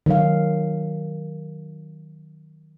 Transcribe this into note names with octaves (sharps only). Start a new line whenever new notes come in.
D#3 F#3 F5